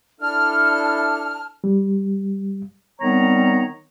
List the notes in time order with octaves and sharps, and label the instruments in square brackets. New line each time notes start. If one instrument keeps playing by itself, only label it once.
[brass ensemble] D4 E4 A4 [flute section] A5 F6
[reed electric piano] G3
[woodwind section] D#3 G3 B3 C4 C#5 A#5